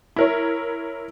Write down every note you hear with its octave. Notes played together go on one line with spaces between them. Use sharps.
E4 A#4 C#5